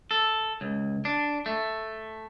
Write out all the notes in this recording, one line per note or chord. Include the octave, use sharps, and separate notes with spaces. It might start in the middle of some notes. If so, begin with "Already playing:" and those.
A4
C#2
D4
A3